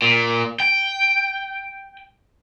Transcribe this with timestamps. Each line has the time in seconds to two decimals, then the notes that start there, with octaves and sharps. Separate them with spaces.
0.02 A#2
0.60 G5